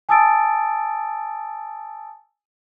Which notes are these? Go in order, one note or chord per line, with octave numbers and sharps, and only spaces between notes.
G#5 A5 D#6 E6 A6 D7